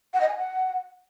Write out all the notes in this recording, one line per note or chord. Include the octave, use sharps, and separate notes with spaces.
F#5
D#5
G#5
F#5